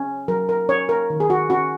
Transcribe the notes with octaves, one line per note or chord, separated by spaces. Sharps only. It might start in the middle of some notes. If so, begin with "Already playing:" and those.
Already playing: C#4
F#3 A#4
A#4
C#4 C#5
A#4
D#3
G#4
F#4
C#4 F#4